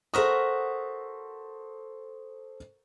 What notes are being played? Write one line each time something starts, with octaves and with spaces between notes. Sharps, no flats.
F#4 A4 A#4 C5 E5 D#6